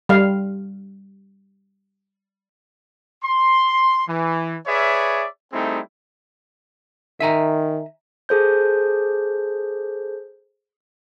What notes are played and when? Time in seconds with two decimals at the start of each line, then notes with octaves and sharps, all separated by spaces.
0.09 G3 F5
3.23 C6
4.07 E3
4.66 G#4 B4 C#5 D5 E5
5.52 G3 A3 C4 D#4 E4 G#4
7.20 D#3 E5 G#5 A#5
8.29 G#4 A4 C5 G6